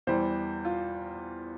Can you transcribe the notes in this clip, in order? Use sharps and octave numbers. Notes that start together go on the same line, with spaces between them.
E2 E3 G3 C5
F4